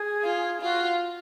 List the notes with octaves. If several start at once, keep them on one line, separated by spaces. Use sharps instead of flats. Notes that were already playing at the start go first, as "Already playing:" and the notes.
Already playing: G#4
F4
F4 F#4